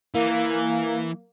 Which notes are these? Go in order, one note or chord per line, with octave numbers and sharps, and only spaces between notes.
E3 A#3